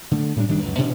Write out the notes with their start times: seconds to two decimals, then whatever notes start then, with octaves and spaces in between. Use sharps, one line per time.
0.11 D3 A3
0.36 A2 G3 D4
0.48 F#1 D#3 G3 D4
0.62 C#2 F#2
0.78 A1 B2 C#4 D4